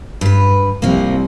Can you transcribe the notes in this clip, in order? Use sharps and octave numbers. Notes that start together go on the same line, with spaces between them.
G2 B4
C2 F3 A#3